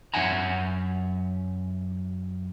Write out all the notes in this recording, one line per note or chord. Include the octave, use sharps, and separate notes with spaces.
F#2 G3 E5 F#5 G#5 A#5